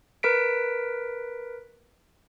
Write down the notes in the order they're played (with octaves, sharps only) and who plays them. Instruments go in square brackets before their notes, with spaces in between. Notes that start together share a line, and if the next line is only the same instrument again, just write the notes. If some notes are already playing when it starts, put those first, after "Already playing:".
[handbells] A#4 B4 B6 D7